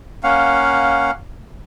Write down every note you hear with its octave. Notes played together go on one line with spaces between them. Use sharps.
A#3 C#4 F5 F#5